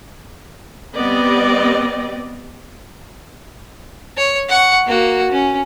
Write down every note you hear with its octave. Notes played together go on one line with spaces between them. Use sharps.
G3 B3 C4 G4 D5 D#5
C#5
F#5 C#6
A#3 F#4
C#4